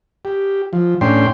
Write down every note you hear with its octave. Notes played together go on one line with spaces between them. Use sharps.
G4
F3
A2 C#4 D4 G5 C6